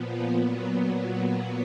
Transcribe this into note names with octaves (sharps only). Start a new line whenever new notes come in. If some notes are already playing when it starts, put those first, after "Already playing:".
Already playing: A#2 F3 B3
A#2 F#3 B3